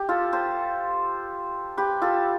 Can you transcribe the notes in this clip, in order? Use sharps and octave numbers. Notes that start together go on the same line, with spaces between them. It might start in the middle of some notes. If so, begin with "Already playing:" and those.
Already playing: G4
F4 A4
A4 C5
G4 B4
F4 A4